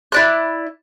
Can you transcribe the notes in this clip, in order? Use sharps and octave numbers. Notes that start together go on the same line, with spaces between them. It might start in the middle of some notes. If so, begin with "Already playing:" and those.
E4 D5 F#6